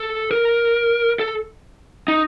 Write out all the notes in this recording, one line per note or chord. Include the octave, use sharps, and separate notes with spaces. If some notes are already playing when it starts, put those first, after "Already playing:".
Already playing: A4
A#4
A4
D#4